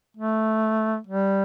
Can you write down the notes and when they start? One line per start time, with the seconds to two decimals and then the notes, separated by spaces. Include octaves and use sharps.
0.17 A3
1.07 G3